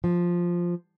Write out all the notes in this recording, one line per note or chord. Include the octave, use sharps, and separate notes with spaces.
F3